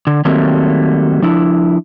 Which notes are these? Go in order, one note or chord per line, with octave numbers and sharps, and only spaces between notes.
D3
D#3 F#3 G3 A3 A#3 C4
F3 D4 E4